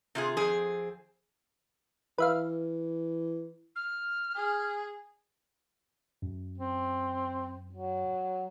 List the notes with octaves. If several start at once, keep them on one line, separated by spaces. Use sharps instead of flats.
C3 F4 G#4
F2 C4 G#4
E3 B4 E5 F5
F6
G#4
F#2
C4
F#3